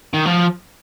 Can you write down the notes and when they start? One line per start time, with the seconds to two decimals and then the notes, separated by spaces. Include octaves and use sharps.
0.13 D#3
0.25 F3